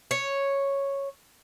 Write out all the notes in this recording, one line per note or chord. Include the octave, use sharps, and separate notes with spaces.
C#5